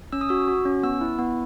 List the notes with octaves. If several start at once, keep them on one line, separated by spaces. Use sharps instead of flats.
C#4 E6
D#6
F#4 E6
F#4
C#4
B3 E6
E4
B3